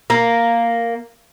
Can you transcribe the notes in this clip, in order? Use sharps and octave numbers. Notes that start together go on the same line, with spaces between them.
A#3